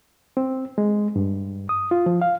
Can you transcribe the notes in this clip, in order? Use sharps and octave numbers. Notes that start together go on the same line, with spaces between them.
C4
G#3
G2
D#6
F4
F3
F5